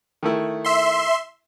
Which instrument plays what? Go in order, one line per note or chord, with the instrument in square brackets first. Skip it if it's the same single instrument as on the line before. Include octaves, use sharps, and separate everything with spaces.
[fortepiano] D#3 A3 E4
[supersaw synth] E5 C6